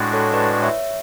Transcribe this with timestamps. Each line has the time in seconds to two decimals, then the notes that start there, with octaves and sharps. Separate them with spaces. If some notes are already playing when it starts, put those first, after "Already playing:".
Already playing: A2 G#3 D4 F#4
0.13 A4 C#5
0.33 B4 D5
0.62 C#5 E5